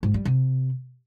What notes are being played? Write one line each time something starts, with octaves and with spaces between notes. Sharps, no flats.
G#2
G3
C3